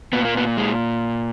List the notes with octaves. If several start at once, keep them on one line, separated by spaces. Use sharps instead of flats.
A#2 B3
A#3
B3
G#3